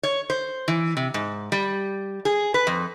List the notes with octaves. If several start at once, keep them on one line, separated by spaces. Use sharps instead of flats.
C#5
C5
E3
C3
G#2
G3
G#4
B4
F2